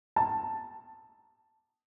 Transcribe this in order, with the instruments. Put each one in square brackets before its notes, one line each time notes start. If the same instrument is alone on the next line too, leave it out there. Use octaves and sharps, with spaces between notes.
[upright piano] A5